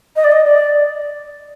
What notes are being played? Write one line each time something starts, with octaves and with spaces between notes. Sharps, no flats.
D#5
D5
D#5
D5